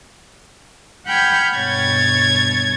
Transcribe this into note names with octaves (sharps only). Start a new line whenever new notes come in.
F#5 G5 B5 F6 G6 G#6
G2 B2 C#5 G#6 A6